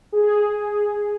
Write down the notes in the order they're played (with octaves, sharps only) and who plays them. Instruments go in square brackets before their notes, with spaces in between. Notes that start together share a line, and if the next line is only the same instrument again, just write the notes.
[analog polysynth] G#4